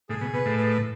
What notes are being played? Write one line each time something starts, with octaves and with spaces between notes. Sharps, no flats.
A2 G#4
B2
B2 B4
A2
B4